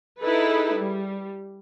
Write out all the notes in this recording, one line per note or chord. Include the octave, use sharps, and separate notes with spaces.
D#4 E4 G#4 A4 B4
G3